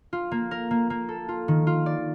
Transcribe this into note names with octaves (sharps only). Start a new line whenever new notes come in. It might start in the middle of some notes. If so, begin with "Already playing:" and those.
F4
A#3
A#4
A#3
A#3
A4
F4
D#3
F4
D5